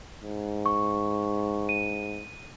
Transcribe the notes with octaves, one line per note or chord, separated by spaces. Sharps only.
G#2
C#6
D#7